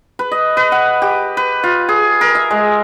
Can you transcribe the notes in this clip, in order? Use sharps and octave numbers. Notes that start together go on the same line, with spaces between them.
B4
D#5
B4
F#5
G4
B4
F4
G#4
A#4
E5
G#3